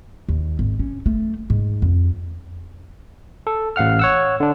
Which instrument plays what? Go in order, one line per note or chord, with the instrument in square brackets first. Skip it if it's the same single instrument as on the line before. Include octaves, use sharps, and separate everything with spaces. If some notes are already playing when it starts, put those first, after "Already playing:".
[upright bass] D#2
G#1
C#4
A3
G#2
F2
[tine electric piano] A4
A1 F5 F#5 F6
C#5 F#5 E6
D3 D4